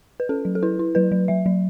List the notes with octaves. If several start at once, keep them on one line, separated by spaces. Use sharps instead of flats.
B4
C#4 A4
F#3
A4
E4 B4
E4
F#3 B4
F#3
F#3 E5
F#3